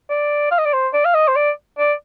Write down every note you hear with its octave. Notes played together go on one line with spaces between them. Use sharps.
D5
F5
D#5
D5
C5
D5
F5
D#5
C5
D5
D5